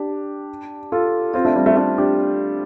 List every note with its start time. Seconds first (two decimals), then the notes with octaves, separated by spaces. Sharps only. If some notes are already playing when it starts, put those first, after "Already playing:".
Already playing: D4 G4
0.92 F4 A4
1.34 C4 F4
1.45 A3 D4
1.56 G3 C4
1.66 A3
1.77 A3 D4
1.98 D4 G4